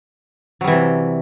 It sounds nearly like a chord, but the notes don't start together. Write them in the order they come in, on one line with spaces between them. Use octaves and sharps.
F#3 G3 E3 C3